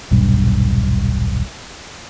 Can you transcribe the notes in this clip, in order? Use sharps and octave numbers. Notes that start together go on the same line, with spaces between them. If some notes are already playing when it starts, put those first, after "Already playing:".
D#1 B1 G2